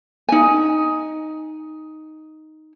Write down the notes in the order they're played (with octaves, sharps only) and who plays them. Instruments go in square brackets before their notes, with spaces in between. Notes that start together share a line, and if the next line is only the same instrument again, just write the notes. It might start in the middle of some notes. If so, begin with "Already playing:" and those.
[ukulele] D#4 G#5